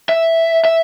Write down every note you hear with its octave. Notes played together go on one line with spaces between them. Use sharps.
E5
E5